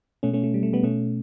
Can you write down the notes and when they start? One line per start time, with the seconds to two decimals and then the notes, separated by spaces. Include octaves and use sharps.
0.23 B2 A3 C#4
0.33 A3 C#4
0.44 A3
0.54 G3
0.63 A3
0.73 G3 B3
0.83 B2 A3 C#4